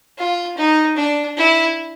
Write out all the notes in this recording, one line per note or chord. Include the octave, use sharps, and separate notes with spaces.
F4
D#4
D4
E4